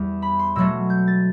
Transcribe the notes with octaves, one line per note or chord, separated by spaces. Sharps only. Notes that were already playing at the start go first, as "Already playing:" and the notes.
Already playing: E2 G3
B5
C6
B2 F#3 A3 E6
G6
A6